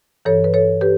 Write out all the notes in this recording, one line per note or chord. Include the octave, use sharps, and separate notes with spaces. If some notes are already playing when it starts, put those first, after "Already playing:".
G2 E3 A4 C#5
B4
A4 C#5
G4 B4